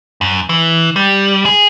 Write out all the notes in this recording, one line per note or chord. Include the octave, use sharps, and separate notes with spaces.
F#2
E3
G3
G#4